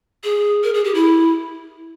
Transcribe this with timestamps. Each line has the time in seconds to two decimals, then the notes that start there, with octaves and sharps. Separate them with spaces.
0.24 G#4
0.64 A#4
0.74 G#4
0.84 G4
0.95 E4